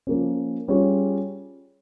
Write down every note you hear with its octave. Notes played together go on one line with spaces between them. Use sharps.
F3 A#3 C#4
G3 C#4 F4 G#4 C#5